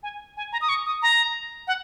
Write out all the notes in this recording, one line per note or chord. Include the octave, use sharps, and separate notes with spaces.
G#5
G#5
A#5
D#6
C#6
D#6
A#5
F#5